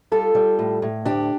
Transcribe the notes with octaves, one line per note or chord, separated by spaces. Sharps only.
G3 F4 A4
G3
A2
A2
D2 D4 G4